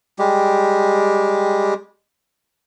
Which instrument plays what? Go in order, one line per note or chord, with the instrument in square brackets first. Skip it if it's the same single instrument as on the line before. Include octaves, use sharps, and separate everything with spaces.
[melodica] G3 G#3 G4